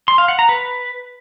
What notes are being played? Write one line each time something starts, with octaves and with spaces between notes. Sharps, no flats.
C6
F5
F#5
A#5
B4